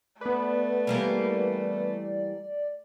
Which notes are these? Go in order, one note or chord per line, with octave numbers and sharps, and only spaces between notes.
A3 B3 B4 D5
E3 G3 A#3